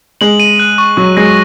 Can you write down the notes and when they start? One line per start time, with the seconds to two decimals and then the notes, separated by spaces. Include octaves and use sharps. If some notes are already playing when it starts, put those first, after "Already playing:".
0.21 G#3 F#7
0.40 D#7
0.60 F#6
0.78 C#6
0.97 F#3 C#6
1.17 G#3 A#6